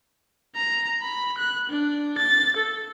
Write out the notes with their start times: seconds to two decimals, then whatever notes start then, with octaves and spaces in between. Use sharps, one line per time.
0.56 A#5
1.02 B5
1.38 F#6
1.70 D4
2.18 A6
2.57 A4